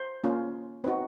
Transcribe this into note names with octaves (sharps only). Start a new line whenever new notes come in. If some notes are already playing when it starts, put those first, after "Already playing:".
Already playing: C5
A#3 C#4 F4
C4 D#4 F#4 B4